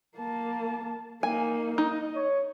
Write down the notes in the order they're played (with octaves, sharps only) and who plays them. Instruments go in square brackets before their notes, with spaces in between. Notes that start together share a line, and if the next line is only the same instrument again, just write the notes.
[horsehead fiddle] A#3 A5
[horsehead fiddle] A#3 D#4 [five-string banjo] G#5
[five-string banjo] D#4 [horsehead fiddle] D#5
[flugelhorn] C#5